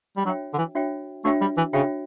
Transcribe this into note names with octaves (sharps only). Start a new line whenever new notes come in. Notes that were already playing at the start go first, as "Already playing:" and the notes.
G3
F#3 D4 F#4 C#5 E5 G5
D3
E3
D4 F#4 C#5 E5 G5
A3 D4 F#4 C#5 E5 G5
G3
E3
C#3 D4 F#4 C#5 E5 G5